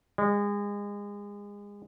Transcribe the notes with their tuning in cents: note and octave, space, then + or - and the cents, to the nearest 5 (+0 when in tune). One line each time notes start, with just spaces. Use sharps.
G#3 -30